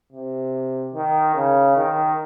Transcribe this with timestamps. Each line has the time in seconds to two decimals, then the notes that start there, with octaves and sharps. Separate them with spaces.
0.12 C3
0.94 D#3
1.35 C#3
1.76 D#3